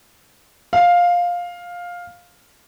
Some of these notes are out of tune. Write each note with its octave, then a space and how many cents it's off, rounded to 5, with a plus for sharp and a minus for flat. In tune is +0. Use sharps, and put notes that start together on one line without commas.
F5 +10